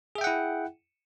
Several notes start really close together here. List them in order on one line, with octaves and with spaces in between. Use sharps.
G#4 E5 G5 F#5 E4